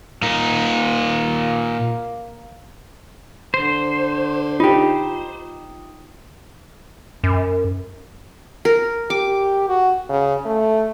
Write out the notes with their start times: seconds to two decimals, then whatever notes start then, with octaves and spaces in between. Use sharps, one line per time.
0.22 A#2 A#3 D#4
3.54 D3 C5
4.60 D#4 F4 G4
7.24 F#2
8.65 A#4
9.10 G4 D6
9.69 F#4
10.09 C#3
10.45 A3